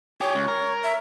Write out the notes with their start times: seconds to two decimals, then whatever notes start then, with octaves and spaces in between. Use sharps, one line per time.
0.21 G4 G#4 C#5
0.35 C#2
0.48 A#4
0.83 E5